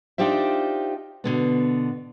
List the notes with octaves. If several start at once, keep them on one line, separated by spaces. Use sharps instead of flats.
D4 D#4 F4 G4 C5 E5
B2 D3 B3